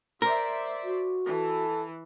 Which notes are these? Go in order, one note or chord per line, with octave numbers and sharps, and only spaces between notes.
A#4 C5 D5 E5
F#4
E3 A4